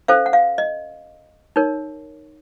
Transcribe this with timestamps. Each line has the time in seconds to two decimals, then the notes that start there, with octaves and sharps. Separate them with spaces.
0.08 C#4 A4 C5 F5
0.26 F#5
0.33 F5
0.58 D#5
1.56 D#4 A#4 C#5